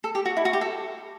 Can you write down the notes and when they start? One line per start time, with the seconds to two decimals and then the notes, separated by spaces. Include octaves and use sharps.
0.04 A4
0.15 G4
0.25 F#4
0.37 E4
0.45 F#4
0.53 G4
0.61 A4